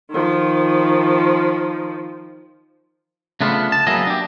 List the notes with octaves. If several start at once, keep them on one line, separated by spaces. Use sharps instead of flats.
D#3 F3
C#3 A3 B3 D4 F4
A5
F#3 A#3 B3 E4 G#4 D#5
D4 G4